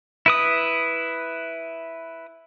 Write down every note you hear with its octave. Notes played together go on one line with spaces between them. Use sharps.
E4 B4 D#6